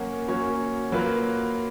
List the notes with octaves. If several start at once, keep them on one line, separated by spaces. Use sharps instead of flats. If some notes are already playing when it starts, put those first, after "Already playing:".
Already playing: F#3 A#3 C#4 F#4 C#5
F#3 A#3 C#4 F#4 C#5
F#3 A#3 F4 B4